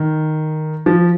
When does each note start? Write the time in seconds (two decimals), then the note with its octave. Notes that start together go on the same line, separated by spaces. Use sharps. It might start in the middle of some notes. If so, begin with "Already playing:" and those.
Already playing: D#3
0.86 F3